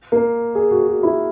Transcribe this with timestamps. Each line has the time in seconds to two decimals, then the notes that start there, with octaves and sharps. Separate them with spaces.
0.12 A#3
0.55 G#4
0.71 F#4
0.87 F#4
1.03 E4